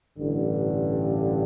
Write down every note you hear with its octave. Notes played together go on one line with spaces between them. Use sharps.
A1 G2 D3